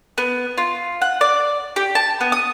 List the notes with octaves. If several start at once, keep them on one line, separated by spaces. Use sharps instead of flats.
B3
F4
F#5
D5
G4
A5
B3
D#6